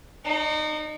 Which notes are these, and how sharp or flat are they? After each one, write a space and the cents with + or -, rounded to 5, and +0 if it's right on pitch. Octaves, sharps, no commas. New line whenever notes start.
D#4 -30 C#5 +40